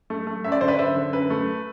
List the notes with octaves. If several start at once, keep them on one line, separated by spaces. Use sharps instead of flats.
A3
A3
F#2 E5
D5
D3 C5
B4 D5
F#2 C5 E5
D3
F#2 B4
A3